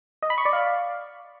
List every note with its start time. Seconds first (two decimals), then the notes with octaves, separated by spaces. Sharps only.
0.22 D#5
0.30 B5
0.38 C#6
0.45 D5
0.53 F5